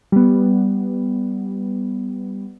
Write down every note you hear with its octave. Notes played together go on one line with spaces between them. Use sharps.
G3 B3